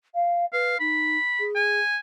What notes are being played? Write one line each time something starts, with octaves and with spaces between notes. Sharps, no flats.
F5
B4 F5
D#4 B5
G#4
G#5